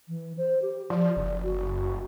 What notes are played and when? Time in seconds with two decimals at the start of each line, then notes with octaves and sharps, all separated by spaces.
0.08 E3
0.38 C5
0.62 G4
0.90 F3 D5
1.17 F#1
1.44 F#4